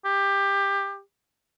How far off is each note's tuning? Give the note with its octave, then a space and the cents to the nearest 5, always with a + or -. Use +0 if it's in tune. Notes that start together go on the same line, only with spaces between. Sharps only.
G4 +20